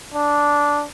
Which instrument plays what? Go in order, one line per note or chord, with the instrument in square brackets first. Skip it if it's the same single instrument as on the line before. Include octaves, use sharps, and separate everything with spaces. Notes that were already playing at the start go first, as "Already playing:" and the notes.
[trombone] D4